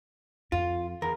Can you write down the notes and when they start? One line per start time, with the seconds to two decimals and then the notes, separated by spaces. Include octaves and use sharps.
0.52 F2 F4
1.02 E2 A#4